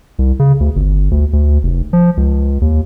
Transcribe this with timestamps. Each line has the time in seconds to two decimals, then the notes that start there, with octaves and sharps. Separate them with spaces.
0.19 C2
0.39 C#3
0.60 D2
0.76 G1
1.11 D2
1.33 D2
1.63 F1
1.93 F3
2.17 C#2
2.61 D#2